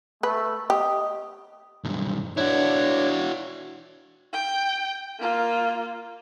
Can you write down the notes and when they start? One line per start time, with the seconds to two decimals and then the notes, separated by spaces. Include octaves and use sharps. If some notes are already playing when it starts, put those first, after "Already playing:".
0.23 A3 B4
0.70 G4 D#5
1.84 B1 G2
2.37 D4 E4 F#4 C#5
4.33 G5
5.19 A#3 F4